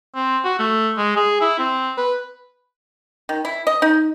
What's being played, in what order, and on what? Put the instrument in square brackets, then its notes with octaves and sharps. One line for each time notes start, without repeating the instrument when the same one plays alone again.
[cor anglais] C4
F#4
A3
G#3
G#4
E4
C4
B4
[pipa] D#3
E4
D#5
D#4